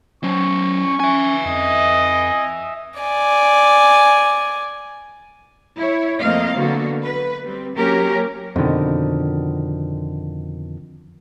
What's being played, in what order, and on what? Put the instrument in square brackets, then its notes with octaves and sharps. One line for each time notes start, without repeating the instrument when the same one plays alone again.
[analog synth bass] F#3 [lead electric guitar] C#4 C5 [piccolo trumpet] C#6
[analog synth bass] C#4 [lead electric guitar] E5 G#5
[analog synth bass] F2 [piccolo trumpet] D#5
[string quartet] D5 G#5
[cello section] E4 C#5
F2 A3 A#3 C4 D#5 F5
D3 F#3 A#3 B3 F#4
B4
G3 C4
F#3 A#3 C#4 G4 A#4
[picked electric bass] F2 B2 D3 D#3